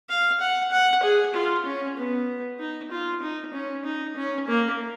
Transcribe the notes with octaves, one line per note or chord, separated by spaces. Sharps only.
F5
F#5
F#5
G#4
F4
C#4
B3
D#4
F4
D#4
C#4
D#4
C#4
A#3